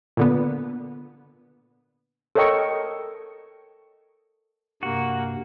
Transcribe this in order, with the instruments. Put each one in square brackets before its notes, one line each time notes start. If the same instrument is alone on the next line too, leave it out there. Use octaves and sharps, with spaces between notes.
[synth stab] A#2 D3 B3
[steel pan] A4 A#4 C#5 D#5 G5 C#6
[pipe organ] G2 C3 [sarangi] A#3 [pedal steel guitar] F#4